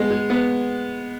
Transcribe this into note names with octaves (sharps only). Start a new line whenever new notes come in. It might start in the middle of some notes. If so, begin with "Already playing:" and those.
Already playing: G#3 B3
G#3
B3